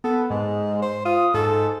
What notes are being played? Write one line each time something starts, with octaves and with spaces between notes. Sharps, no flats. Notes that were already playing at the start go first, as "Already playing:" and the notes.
B3 A4
G#2 G#3
C5
F4 D#6
G#2 A4